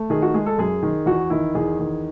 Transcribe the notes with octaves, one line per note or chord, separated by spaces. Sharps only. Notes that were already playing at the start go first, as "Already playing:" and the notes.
Already playing: A3
D#3 G#4
F#4
G#3 G#4
A4
F#2 G#4
D#3
E2 F#4
D#3 E4
E2 G#4
D#3